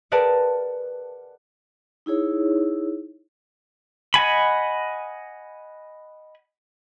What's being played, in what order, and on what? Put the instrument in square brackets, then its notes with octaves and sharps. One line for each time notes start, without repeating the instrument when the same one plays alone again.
[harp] G#4 A#4 B4 D5 F#5 A5
[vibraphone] D#4 E4 G#4 C#5
[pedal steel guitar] D#5 F#5 G#5 B5